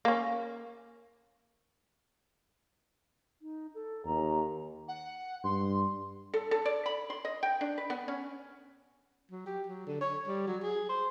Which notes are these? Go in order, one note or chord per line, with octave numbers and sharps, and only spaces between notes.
A#3 C#4
D#4
A4
D#2 A#5
F#5
G2 C6
A4
A4
D5
B5
C6
D#5
G5
D4
B4
B3
C#4
F#3
G4
F#3
D3
C#5
G3
F#3
G#4
C5